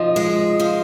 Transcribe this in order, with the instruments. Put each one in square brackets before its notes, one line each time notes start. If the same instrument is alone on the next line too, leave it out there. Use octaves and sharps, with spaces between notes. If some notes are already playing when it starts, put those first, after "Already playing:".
Already playing: [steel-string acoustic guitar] F3 [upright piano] D#5
[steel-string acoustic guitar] G#3
F3